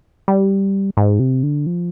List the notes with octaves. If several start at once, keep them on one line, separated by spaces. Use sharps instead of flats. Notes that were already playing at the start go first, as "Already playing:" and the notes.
G3
G#2
C3
D3
F3